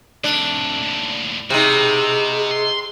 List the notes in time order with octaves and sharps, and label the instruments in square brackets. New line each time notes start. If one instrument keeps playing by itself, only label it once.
[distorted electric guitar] F2 A2 [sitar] D4
[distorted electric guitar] D#2 A2
[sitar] C3 D#4 [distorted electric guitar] F#4 B4 [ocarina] G#4
[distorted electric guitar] C6